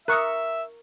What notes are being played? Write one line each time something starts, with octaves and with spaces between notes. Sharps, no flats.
A#4 E5 C#6 D#6 F#6